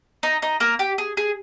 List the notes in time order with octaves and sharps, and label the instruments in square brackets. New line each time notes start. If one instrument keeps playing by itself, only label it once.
[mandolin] D#4 D#5
D#4 D#5
A#3 A#4
G4
G#4
G#4